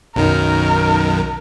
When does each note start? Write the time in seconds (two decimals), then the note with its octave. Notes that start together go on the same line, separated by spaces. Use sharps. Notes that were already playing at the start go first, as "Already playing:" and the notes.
0.16 B1 F#2 D#3 A#4